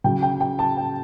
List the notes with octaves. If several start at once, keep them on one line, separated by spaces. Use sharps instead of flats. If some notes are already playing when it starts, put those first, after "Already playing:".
C#3 F#3 G5
G5
G5
A5
G5